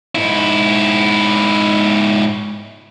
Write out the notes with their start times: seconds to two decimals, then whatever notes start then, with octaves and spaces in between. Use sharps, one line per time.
0.15 G#2 E4